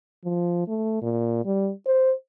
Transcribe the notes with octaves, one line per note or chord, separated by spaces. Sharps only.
F3
A3
A#2
G3
C5